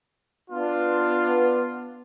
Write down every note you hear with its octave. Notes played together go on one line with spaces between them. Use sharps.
B3 D4 F4